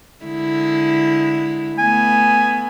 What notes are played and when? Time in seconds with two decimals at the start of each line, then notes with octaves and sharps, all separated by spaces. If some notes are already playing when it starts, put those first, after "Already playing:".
0.25 D3 G#3 E4
1.78 A3 B3 G#5